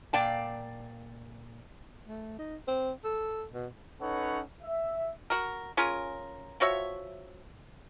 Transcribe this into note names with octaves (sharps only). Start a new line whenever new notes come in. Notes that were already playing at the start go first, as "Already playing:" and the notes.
A#2 D5 F5 G5 A5
A3
D#4
C4
A4
B2
C#4 D#4 A4 B4 C#5 F#5
E5
F#4 A#4
C#4 F4 G#4 A#4
F3 F#4 C#5 E5